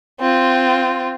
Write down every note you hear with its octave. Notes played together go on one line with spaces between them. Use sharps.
C4 F4